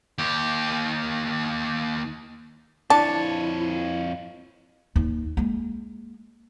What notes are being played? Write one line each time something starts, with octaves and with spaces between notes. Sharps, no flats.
D#2 G4
F2 D4 E4 C#5 A5
D#2
G#3 A#3